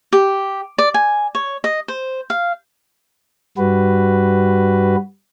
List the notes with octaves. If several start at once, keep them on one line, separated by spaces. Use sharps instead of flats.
G4
D5
G#5
C#5
D#5
C5
F5
G2 G3 F#4 B4